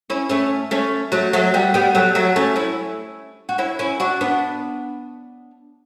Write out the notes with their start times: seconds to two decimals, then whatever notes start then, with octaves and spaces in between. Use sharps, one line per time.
0.10 C#4 E4
0.29 A3 C#4
0.71 A3 C#4
1.12 F#3 A3
1.33 F#3 A3
1.54 G3 B3
1.74 G3 B3
1.95 F#3 A3
2.15 F#3 A3
2.36 A3 C#4
2.56 C#4 E4
3.49 F#4
3.58 C#4 E4
3.79 C#4 E4
4.00 D4 F#4
4.21 B3 D4